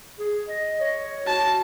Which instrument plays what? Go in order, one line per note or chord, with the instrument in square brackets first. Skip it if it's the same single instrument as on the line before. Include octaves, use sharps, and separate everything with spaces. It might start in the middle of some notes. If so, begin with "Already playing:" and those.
[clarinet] G#4
D#5
C#5
[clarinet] F#4 [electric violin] A5